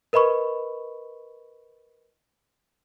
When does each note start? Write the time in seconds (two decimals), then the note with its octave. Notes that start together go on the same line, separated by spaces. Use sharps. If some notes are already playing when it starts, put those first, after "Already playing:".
0.13 A#4 B4 D#5 B5 C#6